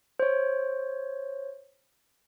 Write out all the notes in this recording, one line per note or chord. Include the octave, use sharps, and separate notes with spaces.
C5 C#5